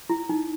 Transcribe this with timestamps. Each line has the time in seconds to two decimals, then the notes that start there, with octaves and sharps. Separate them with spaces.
0.10 E4
0.29 D#4